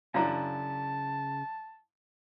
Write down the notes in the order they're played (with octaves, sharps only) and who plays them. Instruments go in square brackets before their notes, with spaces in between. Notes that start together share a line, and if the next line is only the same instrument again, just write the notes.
[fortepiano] F#2 D4 E4 [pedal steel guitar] C#3 [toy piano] F5 A#5 [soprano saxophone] A5